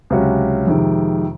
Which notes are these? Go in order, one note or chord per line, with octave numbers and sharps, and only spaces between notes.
C#2 C3 F#3 C#4 F#4
F2 C3 D#3 G#3